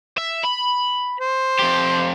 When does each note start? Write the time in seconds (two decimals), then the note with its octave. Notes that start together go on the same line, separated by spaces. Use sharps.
0.18 E5
0.45 B5
1.20 C5
1.59 F2 G4